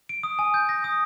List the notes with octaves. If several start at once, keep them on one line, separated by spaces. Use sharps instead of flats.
D7
D#6
G#5
G6
A#6
D#6